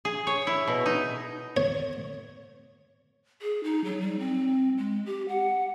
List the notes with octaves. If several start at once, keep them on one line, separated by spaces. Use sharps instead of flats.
G#4
C#5
E4
B2
D#4
C#5
G#4
D#4
F#3
G3
C4
G#3
G4
F#5